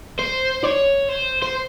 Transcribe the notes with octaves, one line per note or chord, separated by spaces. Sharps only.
C5
C#5
C5
C5